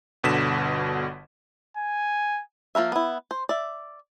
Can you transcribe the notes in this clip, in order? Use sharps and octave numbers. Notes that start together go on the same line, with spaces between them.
G1 B2 D3 B6 E7
G#5
F3 A#3 A#4 E5
B3 E4
C5
D5 E5